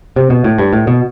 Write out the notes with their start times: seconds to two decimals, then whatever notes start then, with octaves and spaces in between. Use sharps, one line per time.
0.16 C3
0.30 B2
0.44 A2
0.58 G2
0.73 A2
0.87 B2